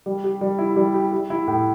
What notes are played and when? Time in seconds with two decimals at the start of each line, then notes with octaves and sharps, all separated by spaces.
0.06 G3
0.24 G4
0.41 G3
0.58 E4
0.76 G3
0.94 G4
1.12 G4
1.30 E4
1.47 A2